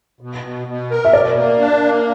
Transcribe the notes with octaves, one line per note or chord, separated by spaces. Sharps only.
B2
B2
B2
A#4
E5
B2 D5
A#3
D4
A#3